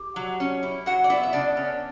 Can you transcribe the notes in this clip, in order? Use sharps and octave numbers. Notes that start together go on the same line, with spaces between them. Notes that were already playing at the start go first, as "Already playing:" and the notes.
Already playing: G4
F#3
C#4
E4
F#3 F#4 F#5
D5
B3 E4 E5
E5
C#3 D4 D5
C#4